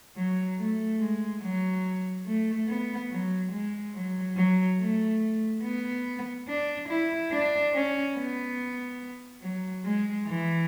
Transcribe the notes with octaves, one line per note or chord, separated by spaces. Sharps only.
F#3
A3
G#3
F#3
A3
B3
F#3
G#3
F#3
F#3
A3
B3
D4
E4
D4
C#4
B3
F#3
G#3
E3